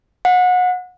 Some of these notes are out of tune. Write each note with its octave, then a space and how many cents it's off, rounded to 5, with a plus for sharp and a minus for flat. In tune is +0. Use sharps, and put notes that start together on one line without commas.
F#5 -30